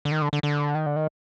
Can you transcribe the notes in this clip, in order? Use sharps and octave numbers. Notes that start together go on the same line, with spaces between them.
D3
D#3
D3
D3
D3
D#3
D3
D#3